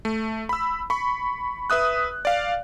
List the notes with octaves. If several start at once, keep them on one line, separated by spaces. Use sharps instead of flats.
A3
B5 E6
B5 C#6
B4 E5 D#6 F#6
D5 F5